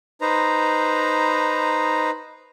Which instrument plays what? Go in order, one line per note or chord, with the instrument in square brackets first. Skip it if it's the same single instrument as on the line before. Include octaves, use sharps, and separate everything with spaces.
[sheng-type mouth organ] D#4 B4 C5 A#5